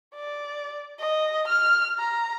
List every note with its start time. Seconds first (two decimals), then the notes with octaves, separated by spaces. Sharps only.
0.15 D5
1.00 D#5
1.48 F6
1.99 A#5